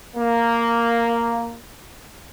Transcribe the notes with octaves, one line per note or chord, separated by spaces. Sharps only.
A#3